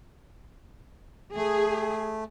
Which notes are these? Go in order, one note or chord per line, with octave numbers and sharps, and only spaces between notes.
A3 G#4